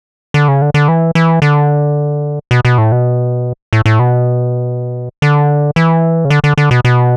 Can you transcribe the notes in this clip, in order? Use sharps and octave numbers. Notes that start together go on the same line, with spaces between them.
D3
C#3
D3
D3
E3
E3
D3
B2
B2
A2
B2
A2
A2
B2
D3
E3
C#3
D3
D3
D3
B2
B2